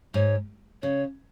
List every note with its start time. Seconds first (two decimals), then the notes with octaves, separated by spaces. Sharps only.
0.14 G#2 C#5
0.82 C#3 C#5